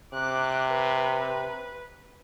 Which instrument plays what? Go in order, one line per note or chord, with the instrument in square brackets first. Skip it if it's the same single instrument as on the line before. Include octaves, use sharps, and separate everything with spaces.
[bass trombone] C3 [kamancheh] D6 F#6
[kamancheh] B4